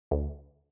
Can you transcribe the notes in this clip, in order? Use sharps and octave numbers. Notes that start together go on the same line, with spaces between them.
D2